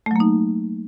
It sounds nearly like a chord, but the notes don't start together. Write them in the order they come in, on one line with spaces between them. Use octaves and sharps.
A3 F#3 A#3 D#4